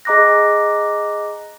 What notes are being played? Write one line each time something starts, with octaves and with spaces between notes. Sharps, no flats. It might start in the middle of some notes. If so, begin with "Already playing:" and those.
G#4 D#5 A#5 D6 F#6 A#6